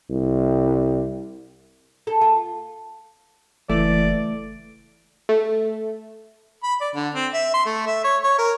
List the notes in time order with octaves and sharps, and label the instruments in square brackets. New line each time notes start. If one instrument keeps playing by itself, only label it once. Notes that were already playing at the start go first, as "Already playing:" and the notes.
[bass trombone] C2
[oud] A4
F4
[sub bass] F#1 [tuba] E3 [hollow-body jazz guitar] A3 [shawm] D5
[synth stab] A3
[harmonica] B5
D5
D3
C4
E5
C6
A3
E5
C#5
C#5
A#4